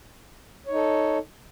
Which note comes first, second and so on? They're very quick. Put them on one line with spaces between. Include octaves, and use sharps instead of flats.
C#5 D#4 A4